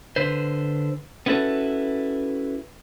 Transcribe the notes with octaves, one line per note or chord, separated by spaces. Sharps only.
D3 B4 C5
B3 C#4 E4 F#4 A4 B4